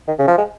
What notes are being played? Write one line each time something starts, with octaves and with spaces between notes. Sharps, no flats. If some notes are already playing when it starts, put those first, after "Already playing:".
D#3
C#3
F3
G#3